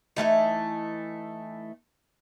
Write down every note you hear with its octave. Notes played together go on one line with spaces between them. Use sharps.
E3 G#3 A3 D#4